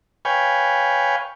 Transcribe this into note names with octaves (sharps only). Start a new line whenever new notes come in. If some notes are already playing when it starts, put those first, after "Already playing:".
B4 C#5 F5 G5 G#5